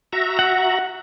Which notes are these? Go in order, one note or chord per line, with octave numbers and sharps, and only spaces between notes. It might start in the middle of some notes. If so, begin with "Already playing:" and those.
F#4 E5 A#5
F#5